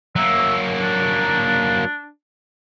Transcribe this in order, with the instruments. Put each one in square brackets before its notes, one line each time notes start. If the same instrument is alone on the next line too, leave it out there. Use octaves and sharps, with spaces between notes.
[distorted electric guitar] F#3 A#3 [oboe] E5
[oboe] D4